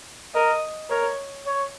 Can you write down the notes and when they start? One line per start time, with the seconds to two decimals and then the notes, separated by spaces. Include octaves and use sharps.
0.34 A#4 D#5
0.90 A#4 C#5
1.46 C#5